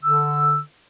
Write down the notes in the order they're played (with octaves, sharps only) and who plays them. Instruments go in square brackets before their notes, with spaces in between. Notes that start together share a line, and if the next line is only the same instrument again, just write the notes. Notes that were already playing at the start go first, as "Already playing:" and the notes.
[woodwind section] D3 E6